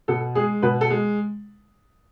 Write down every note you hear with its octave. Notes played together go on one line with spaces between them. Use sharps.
B2 A4
G#3 G#4
B2 B4
A4
G#3